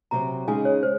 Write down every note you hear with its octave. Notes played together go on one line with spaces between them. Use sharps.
C3 F#3 C4 A#5
C#3 G#3 D#4 G#4 G#5
C#5
C5